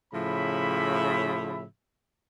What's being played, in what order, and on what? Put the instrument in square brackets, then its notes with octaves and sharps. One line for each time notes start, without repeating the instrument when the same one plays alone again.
[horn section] A2 C#3 F3 E5 B5